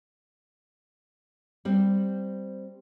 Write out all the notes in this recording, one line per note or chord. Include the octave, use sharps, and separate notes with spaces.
G3 C4